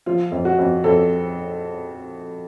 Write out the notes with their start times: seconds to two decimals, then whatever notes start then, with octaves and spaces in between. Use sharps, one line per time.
0.06 F3 F4
0.31 F2
0.45 F#4
0.58 F2
0.84 F2 A4